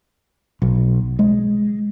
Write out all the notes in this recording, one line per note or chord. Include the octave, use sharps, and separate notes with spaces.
B1
G#3